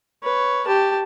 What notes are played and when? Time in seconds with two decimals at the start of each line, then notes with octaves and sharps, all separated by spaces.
0.23 B4 C#5
0.67 G4 A5